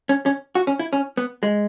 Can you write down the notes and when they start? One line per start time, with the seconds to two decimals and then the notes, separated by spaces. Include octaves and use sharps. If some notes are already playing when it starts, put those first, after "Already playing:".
0.09 C#4
0.26 C#4
0.55 F#4
0.67 C#4
0.79 E4
0.93 C#4
1.17 B3
1.43 G#3